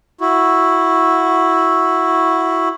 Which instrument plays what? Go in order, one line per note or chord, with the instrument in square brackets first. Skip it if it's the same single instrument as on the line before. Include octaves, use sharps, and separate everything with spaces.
[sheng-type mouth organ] E4 F#4